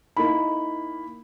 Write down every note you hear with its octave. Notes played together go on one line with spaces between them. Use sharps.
A#3 D#4 E4 B5